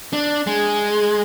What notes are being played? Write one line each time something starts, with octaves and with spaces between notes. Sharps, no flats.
D4
G#3